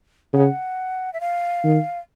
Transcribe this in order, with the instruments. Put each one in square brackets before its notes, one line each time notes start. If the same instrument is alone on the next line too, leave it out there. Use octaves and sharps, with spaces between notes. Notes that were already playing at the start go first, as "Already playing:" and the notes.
[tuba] C#3 [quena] F#5
[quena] E5
F5
[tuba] D#3